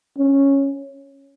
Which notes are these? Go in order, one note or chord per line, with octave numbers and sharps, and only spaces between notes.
C#4